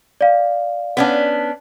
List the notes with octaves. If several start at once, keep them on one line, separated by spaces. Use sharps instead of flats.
D5 F5
B3 C#4 D4